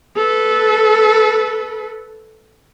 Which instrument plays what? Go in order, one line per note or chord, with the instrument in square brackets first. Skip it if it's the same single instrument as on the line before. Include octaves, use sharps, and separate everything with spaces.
[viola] A4 B4